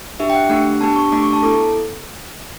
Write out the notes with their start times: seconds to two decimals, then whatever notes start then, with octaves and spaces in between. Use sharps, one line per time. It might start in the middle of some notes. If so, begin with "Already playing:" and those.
0.20 D4 G4 E5
0.30 G5
0.35 F#5
0.49 A3 D4 G4 F#5
0.81 B3 D4 G4 A5
0.96 C#6
1.12 A3 D4 G4 D6
1.23 C#6
1.33 A5
1.42 B3 E4 A4 D6